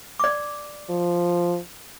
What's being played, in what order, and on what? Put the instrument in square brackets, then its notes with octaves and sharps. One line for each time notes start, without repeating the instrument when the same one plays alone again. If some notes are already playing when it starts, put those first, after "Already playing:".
[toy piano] D5 D6
[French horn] F3